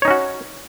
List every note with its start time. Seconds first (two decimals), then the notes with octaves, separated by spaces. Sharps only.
0.02 C#5
0.05 D#4
0.08 C#4
0.11 F#4